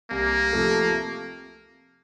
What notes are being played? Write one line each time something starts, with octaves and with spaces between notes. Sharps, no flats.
C2 A#3
C3 F3 A3